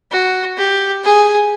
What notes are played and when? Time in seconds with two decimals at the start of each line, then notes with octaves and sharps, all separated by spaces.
0.11 F#4
0.57 G4
1.03 G#4